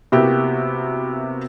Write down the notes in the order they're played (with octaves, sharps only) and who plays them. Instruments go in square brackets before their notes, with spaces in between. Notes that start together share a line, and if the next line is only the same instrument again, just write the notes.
[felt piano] C3 A#3 B3 E4 F#4 G4